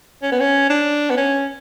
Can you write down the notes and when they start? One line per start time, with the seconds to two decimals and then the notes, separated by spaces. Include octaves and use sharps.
0.23 C#4
0.32 B3
0.40 C#4
0.70 D4
1.11 B3
1.17 C#4